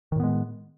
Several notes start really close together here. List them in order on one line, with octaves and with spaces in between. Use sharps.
D#3 A2 B3 G#3